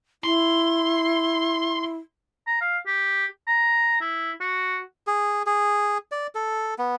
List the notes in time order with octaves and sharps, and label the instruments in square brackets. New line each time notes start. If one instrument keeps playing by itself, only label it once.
[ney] E4 [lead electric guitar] C6
[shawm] A#5
F5
G4
A#5
E4
F#4
[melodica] G#4
G#4
D5
A4
B3